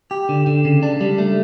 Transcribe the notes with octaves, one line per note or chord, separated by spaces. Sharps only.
G4
D3
D3
C#3
D4
G3
A3